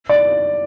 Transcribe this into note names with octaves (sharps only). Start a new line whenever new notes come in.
D5